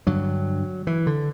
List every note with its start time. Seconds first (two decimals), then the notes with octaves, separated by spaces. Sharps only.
0.06 G2 D3 F#3
0.87 E3
1.07 D3